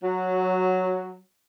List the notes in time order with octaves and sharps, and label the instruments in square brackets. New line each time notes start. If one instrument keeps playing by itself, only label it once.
[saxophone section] F#3